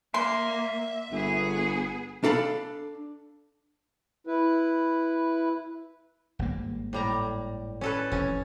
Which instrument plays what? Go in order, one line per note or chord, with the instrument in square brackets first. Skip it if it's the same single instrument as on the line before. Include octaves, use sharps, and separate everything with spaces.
[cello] A#3 [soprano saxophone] E5 [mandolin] C6
[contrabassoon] G1 [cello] B3 G#4
[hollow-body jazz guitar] D4 A4 F5 B5
[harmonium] E4 B4
[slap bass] G#1 G2 A#3
[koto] A2 G3 A#5
C#4 A4 B4
[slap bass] F1 C3 [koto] C#4